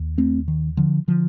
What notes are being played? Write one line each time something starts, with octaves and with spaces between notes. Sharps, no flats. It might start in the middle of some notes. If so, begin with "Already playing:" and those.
Already playing: D#2
A3 C4
D#3
D3 F3
D3 F3